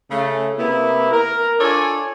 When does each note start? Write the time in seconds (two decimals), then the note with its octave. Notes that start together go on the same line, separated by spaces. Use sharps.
0.11 C#3 A3
0.58 C3 A#3 B3 E4
1.12 A#4
1.60 D4 F4 A4 C#5 D5 G#5